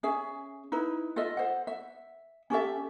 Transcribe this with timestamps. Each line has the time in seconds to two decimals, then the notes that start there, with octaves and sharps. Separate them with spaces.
0.03 C#4 G#4 E5
0.72 D#4 E4 B4
1.16 F4 A4 D#5 E5
1.37 C5 F#5
1.67 E5
2.50 C#4 G4 A4 E5